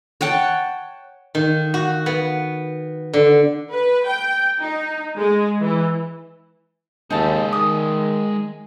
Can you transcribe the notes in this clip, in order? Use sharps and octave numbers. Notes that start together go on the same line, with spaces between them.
C#5 F#5 G5 A5
D#3
F#4
B3
D3
B4
G5
D#4
G#3
E3
D#2 G#3 D#4 E5 A5
D#3 D#6